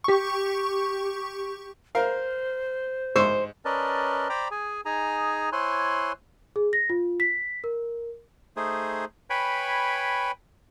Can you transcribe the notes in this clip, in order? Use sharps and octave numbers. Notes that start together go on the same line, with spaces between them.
G4 C#6
A#4 C5 F5
G#2 C5 C#6 E6
C#4 A#4 B4 D5 D#5 A5
C5 D5 G5 A#5 B5 D6
G#4 G#5
D#4 G#4 G#5 A#5
E4 C5 C#5 G#5 C6 F#6
G#4
A#6
F4
B6
A#4
A3 D#4 G#4 C5
B4 C#5 G5 G#5 B5